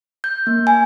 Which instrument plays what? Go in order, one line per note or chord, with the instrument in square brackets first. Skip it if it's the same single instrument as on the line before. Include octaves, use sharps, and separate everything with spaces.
[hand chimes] G6
A#3
G#5